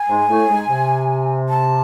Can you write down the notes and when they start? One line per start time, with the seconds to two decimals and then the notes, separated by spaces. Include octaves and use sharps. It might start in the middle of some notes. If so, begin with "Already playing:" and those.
Already playing: G#5
0.08 G#2 G#3
0.28 A2 A3
0.48 G#2 G#3
0.69 C3
1.49 A5